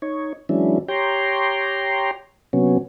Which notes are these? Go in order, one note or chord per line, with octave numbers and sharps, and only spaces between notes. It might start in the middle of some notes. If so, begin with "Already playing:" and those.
D#4 C#5
E3 F#3 G#3 C#4 D4 E4
G4 C#5 G5 A#5 C6
C3 F#3 B3 C#4